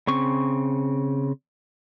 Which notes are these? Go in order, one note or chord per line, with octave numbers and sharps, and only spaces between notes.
C#3 C4 C#6